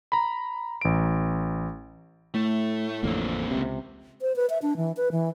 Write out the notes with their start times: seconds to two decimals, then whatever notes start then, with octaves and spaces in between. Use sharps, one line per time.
0.12 A#5 B5
0.81 A1 D7
2.34 A2 A3
3.04 A1 F2 D3 A#3 C4
3.51 C#2 C3
4.21 C5
4.36 B4
4.50 E5
4.62 D4
4.77 E3
4.97 B4
5.12 E3